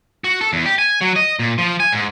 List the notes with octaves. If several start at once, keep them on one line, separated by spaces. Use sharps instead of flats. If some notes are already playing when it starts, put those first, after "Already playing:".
F#4
A4
E2
G4
G#5
F#3
D#5
A#2
F3
G#5
G#2